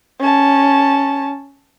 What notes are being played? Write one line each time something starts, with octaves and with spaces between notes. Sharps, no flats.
C#4 A5